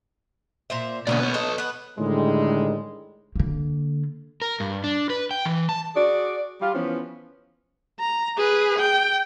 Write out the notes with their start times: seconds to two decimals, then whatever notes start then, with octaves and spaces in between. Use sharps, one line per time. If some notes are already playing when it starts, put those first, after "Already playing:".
0.70 A#2 C5 E5
1.07 B2 D3 A#3 B3 C#4 D5
1.20 B4 C#5
1.34 A4 D#5
1.58 B3 B4
1.98 A2 D3 D#3 G3 G#3
3.36 D3 A#3
4.42 A#4
4.60 G2
4.84 D4
5.10 B4
5.31 G5
5.45 E3
5.69 A5
5.95 F#4 G#4 D5
6.61 G3 F4
6.74 E3 F3 B3 C#4
7.99 A#5
8.37 G#4 B4
8.78 G5